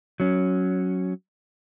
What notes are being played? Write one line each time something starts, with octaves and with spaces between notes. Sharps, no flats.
F#3 C#4